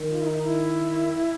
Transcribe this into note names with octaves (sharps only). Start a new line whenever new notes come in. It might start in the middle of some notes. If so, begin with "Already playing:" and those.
Already playing: D#3
F4
E4
D#4
E4